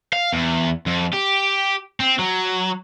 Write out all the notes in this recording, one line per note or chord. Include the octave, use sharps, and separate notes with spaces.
F5
E2
F2
G4
C4
F#3